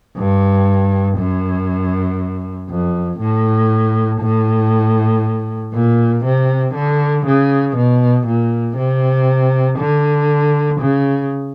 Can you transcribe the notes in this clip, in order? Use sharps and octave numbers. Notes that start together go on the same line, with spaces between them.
G2
F#2
F2
A2
A2
A#2
C3
D3
C#3
B2
A#2
C3
D3
C#3